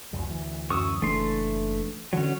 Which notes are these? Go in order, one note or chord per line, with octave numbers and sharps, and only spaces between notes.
E1 C#2 F#2
D2 E3
F#2 C#6 D#6 E6
F#1 E3 A3 D4 C6
D3 E3 F#3 C#4